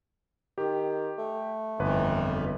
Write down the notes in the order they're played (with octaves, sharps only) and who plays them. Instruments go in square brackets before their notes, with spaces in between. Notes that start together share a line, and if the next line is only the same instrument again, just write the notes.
[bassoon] D#3 [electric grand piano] G4
[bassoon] A3
[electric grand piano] G1 B4 [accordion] F2 E3